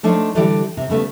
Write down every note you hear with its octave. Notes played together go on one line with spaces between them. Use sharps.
F3 A3 D4 D#4 C5 C#5
D3 E3 G3 G4 A4 D5
C3 C4
C#3 G3 A3 B3